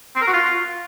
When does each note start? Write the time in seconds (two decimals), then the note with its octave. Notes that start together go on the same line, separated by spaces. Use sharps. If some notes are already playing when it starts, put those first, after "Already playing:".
0.16 C4
0.21 A#4
0.27 F#4
0.33 F4